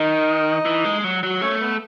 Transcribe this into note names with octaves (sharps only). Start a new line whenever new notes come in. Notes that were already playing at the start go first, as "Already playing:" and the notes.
Already playing: D#3 D#4 D#5
E3
G#3
F#3
F#3
A3 C#4 C#5
B3 B4